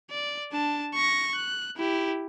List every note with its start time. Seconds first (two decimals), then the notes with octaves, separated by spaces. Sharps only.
0.11 D5
0.52 D4 A5
0.95 C#6 A#6
1.36 F#6
1.77 E4 G4